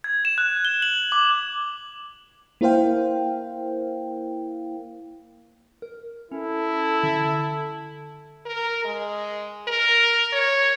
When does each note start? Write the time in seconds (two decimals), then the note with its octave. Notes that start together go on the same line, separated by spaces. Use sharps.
0.04 G#6
0.25 E7
0.38 F#6
0.65 G7
0.82 F#7
1.12 D6
2.61 A#3 E4 A#4 C5 F5 G5
5.82 A#4
6.32 C#4 E4 A4
7.03 D3
8.46 A#4
8.85 G#3
9.68 A#4
10.32 C#5